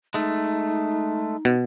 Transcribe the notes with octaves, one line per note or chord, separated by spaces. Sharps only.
G#3 A3 D#4
B2